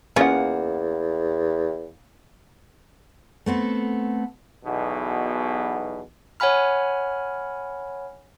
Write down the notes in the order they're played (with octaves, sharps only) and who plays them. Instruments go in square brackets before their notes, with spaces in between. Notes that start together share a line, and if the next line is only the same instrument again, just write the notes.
[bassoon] E2 [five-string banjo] A#3 F#5 [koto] C#4 F4 D#5
[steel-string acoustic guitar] A3 B3 C4 A4
[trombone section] B1 E2 B2
[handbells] C#5 F#5 G#5 B5 F6